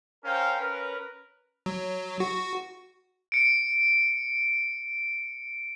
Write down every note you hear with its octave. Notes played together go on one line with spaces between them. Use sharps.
C#4 A#4 C5 F5 G5 A#5
C#4 A#4 B4
F#3
F#4
C#7 D7